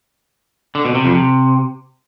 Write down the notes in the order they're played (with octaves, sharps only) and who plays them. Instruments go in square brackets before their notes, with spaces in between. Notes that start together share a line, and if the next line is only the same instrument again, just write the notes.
[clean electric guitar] D3
B2
C3
F2
C3